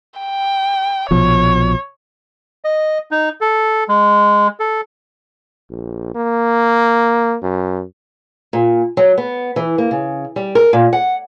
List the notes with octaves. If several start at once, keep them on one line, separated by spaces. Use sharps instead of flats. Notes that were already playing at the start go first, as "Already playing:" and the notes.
G5
A#1 B2 F3 C#5
D#5
D#4
A4
G#3
A4
A#1
A#3
F#2
A#2
F#3
B3
E3
A#3
C#3
G3
A#4
A#2
F#5